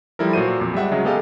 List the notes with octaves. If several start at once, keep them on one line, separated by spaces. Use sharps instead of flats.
F3 G3 E4 A4 A#4
A#2 F#3 F#4 C5 D#7
F2 A#2
G3 G#3 E5 F#5
C#3 F#3 G#3
G#3 B3 G4 A4 D#5 F5